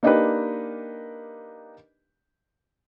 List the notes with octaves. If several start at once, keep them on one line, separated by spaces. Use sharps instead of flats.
A#3 D4 D#4 G4 A#4 B4